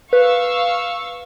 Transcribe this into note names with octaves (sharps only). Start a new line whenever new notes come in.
B4 F5 C#6 E6